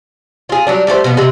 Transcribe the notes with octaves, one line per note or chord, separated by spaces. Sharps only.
F4 G#4
F#3 G3 D4
G3 A3 G4 C5
B2 F3 B3
C3 G3 G#3